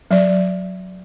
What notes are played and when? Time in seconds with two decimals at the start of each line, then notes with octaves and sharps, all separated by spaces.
0.11 F#3 D5